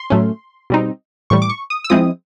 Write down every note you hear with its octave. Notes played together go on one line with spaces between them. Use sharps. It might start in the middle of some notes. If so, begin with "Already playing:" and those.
Already playing: C6
A2 F#3 A3 C#4
B2 G3 C4 D#4
A2 E3 G3 C#6
D6
C#6
D#6
E6
F3 G#3 C4 E4 D#6